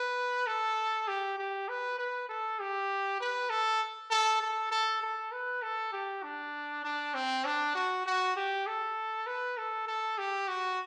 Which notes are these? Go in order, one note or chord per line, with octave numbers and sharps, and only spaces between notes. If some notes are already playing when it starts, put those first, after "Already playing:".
Already playing: B4
A4
G4
G4
B4
B4
A4
G4
B4
A4
A4
A4
A4
A4
B4
A4
G4
D4
D4
C4
D4
F#4
F#4
G4
A4
B4
A4
A4
G4
F#4